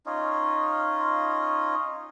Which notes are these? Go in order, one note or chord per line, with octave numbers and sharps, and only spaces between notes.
C#4 D#4 F4